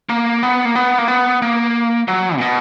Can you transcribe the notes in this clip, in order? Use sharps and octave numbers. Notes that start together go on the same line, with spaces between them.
A#3
B3
A#3
B3
A#3
B3
A#3
F#3
A#2
B2